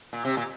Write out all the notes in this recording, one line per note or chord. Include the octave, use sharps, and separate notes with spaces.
A#2
C3
A#2